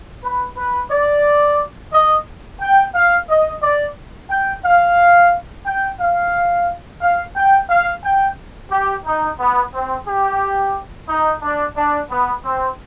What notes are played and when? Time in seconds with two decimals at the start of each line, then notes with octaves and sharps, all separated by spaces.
0.23 B4
0.56 B4
0.90 D5
1.92 D#5
2.60 G5
2.94 F5
3.29 D#5
3.62 D5
4.30 G5
4.64 F5
5.66 G5
6.00 F5
7.01 F5
7.36 G5
7.69 F5
8.03 G5
8.71 G4
9.05 D#4
9.39 B3
9.73 C4
10.07 G4
11.08 D#4
11.42 D4
11.76 D4
12.10 B3
12.44 C4